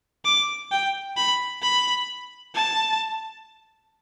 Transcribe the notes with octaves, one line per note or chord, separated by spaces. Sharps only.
D6
G5
B5
B5
A5